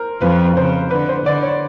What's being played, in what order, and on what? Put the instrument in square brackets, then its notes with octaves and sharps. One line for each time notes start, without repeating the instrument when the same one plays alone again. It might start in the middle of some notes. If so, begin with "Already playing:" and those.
Already playing: [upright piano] A#4 C5
[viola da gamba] F2 F3 [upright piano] B4
[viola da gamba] C#3 [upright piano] C5
[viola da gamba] D3 [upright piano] B4
[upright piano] C5
[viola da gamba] D3 [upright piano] D5
[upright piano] C#5